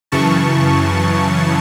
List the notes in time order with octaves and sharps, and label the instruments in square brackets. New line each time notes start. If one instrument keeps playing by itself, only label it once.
[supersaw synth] F#2 C#3 E3 A5 C#6